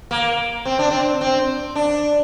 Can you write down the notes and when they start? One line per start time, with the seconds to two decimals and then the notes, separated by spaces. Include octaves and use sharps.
0.11 A#3
0.65 C4
0.79 D4
0.91 C4
1.21 C4
1.75 D4